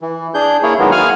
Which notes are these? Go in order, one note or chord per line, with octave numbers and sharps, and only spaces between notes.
E3
D4 G#4 G6
A#3 E4 G#4 C#5
D#3 F#3 G#3 A#3 B3
F5 F#5 G#5 F6